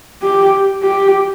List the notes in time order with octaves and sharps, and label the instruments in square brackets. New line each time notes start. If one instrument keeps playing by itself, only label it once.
[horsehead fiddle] G4
G4